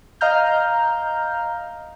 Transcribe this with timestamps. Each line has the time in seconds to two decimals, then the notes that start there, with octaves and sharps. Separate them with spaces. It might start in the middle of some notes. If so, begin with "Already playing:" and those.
0.21 D#5 F5 A#5 F6 G6